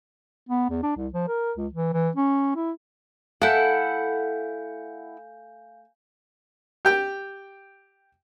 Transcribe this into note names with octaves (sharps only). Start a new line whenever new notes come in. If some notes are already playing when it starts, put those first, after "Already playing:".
B3
E2
D4
C2
F3
A#4
C#2
E3
E3
C#4
E4
A3 E4 A4 F5 F#5 G#5 G6
G4 G5